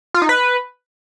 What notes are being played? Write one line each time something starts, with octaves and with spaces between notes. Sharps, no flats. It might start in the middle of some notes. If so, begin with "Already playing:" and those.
F4
D#4
B4